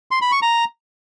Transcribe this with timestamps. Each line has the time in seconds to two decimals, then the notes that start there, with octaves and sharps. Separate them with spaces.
0.11 C6
0.22 B5
0.32 C#6
0.42 A#5